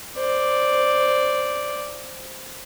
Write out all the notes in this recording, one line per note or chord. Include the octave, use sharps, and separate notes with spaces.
C5 D5